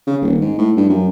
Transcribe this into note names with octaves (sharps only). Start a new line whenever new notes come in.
C#3
D#1
G#2
A2
G2
F#2